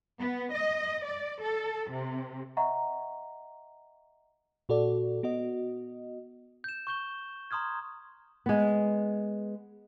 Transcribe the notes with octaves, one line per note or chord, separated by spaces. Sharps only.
B3
D#5
D5
A4
C3
D#5 E5 F#5 A#5 C#6
A#2 F#4 A4 D5
B3 F#4 D#5
G6 E7
C#6 G6 G7
A#5 C6 D#6 F6 G#6
G#3 B3